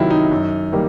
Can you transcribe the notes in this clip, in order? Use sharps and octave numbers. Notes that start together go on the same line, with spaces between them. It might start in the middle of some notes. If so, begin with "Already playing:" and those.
Already playing: C3 D#3 F#3 E4 F4
D#4
F#2
D#3 G3 A#3